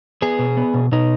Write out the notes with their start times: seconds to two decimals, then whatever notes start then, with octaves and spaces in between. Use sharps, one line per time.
0.22 B3 G#4
0.39 B2
0.57 B3
0.74 B2
0.92 B2 D#4